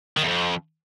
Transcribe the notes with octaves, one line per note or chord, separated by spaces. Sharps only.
D#3
E2
F2